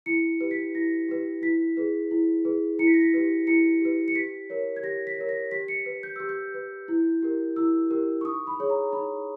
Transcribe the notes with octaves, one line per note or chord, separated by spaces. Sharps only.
E4 C#7
G4 B4
B6
E4 A#6
G4 B4
E4 B6
G#4 B4
E4
G#4 B4
E4 C#7
B6
A#6
B6
G4 B4
E4 C#7
G4 B4
C#7
G4 B6
A#4 C#5
G#6
G4 A#6
B6
A#4 C#5
A#6
G4 B6
C#7
B4
G6
G4 E6
G6
B4
E4
G4 A#4
E4 E6
G4 A#4
C#6
D#4 D#6
B5
G#4 C#5
A#5
D#4 B5